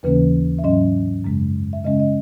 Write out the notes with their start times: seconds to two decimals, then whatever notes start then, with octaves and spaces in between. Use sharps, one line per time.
0.03 D#2 C#3 E3 A#3 C#4 B4
0.58 E5
0.64 G#2 F#3 C#4 D#5
1.24 F#2 C#3 G#3
1.73 E5
1.85 C#3 G#3 C#4 D#5
2.00 D#5